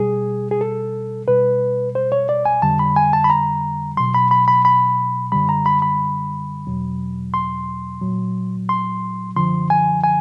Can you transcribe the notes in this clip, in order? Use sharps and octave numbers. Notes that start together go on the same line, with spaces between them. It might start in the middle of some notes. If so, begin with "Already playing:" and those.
Already playing: B2 G3 G#4
G#4
A4
B2 G3 B4
C5
C#5
D5
G#5
F2 D3 G3 A5
B5
G#5
A5
B5
A#5
B2 F#3 C6
B5
B5
B5
B5
F#2 D3 G3 B5
A#5
B5
B5
E2 B2 F#3
C6
A#2 F#3
C6
F#2 D3 F3 C6
G#5
G#5